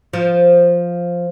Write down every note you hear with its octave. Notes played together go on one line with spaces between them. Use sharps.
F3